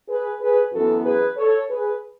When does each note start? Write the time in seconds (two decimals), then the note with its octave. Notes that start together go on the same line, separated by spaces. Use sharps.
0.08 G#4 B4
0.40 G#4 B4
0.73 F#2 E3 B3 F#4 A4
1.05 G#4 B4
1.37 A4 C#5
1.69 G#4 B4